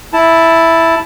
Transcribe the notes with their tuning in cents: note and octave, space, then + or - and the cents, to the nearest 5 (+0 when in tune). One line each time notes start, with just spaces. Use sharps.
E4 +0 A5 +0